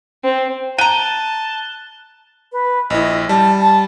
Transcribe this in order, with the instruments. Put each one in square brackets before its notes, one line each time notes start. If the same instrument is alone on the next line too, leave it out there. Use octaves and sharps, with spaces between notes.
[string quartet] C4
[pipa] G5 A#5 [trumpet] A5 [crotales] F#6 G7 [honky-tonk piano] D#7
[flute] B4
[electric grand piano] A#1 E4 [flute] D#5
[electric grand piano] G3 [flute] A5
[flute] A5